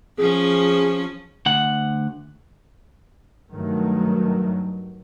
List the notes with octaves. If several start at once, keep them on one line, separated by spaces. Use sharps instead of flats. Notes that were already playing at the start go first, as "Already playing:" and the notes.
F3 C#4 G#4
D2 F#5
G2 D#3 F#3 A3